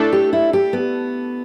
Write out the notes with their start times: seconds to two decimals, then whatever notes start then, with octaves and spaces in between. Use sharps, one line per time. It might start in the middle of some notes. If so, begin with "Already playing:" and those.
Already playing: A2 A3 D4 A4
0.12 G4
0.33 E4
0.53 G4
0.73 B3